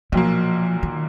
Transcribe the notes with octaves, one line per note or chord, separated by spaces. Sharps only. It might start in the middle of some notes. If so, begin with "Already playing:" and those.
B1 A#2 F3 F#3 A#3
D#3